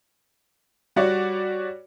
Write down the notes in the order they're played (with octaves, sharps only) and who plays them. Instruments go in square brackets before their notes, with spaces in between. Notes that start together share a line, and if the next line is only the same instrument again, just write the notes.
[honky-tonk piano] G3 F#4 C#5 D5